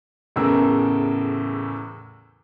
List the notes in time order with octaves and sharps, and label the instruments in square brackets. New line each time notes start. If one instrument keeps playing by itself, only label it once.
[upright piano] E2 A2 C#3 A#4 E6